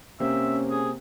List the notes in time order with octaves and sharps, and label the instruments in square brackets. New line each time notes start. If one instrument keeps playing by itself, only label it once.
[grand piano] C3 A#3 C4 [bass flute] C#4 [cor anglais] E5
[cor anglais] G#4